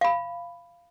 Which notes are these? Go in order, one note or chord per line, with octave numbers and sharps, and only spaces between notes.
F5 B5